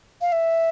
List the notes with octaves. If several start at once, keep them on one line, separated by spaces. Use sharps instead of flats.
F5
E5